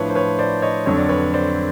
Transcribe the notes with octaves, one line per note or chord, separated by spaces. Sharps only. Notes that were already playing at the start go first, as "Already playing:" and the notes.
Already playing: A2 F3 A3 D4 B4 C#5
C5
B4 C#5
C5 D5
C#5 D#5
F2 D3 F#3 C#5
D5
B4 C#5
C5 D5